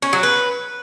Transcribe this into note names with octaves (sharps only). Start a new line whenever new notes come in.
C#4
F#3
B4